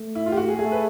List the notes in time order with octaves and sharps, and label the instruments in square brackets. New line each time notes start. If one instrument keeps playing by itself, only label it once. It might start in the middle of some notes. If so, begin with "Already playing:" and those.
Already playing: [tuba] A3
[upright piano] E4
F4
G4
F#4
G#4
[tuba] A3 [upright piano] G#4
[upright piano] B4